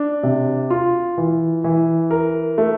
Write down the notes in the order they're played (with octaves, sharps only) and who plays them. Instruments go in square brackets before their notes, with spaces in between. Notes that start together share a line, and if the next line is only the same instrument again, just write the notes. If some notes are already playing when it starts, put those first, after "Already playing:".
Already playing: [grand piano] D4
C3
F4
E3
E3
A#4
A3